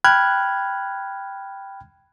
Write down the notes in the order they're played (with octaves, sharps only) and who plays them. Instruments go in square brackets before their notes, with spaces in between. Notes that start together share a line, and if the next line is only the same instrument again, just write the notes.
[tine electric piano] G5 B5 F6 F#6 G#6